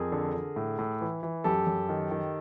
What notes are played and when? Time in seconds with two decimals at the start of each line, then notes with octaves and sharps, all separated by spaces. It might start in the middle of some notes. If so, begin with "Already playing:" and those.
Already playing: F2 G#4 A#4
0.12 D3
0.34 D3
0.56 A2
0.79 A2
1.01 E3
1.23 E3
1.44 F#2 G4 A4
1.67 F#2
1.89 D#3
2.11 D#3